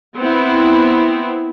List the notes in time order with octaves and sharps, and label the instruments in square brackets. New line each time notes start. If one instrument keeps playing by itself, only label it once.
[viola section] B3 C4 E4